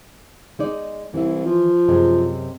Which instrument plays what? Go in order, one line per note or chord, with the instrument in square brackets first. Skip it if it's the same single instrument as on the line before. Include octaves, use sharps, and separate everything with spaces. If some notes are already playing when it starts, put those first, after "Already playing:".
[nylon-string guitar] G#3 D#4 D5
[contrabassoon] C2 [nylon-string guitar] E3 E4
[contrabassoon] F3
[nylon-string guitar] F#2 C3 G#3